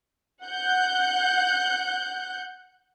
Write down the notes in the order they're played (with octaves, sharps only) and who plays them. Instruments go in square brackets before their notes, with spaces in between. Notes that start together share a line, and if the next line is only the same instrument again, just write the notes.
[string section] F#5 F#6 G6